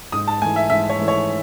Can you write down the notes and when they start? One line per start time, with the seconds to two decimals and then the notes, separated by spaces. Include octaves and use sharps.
0.12 G#2 D#6
0.28 A5
0.41 A3 G#5
0.45 E3
0.56 E5
0.70 G#2 E5
0.90 C#5
0.99 E3 A3
1.08 C#5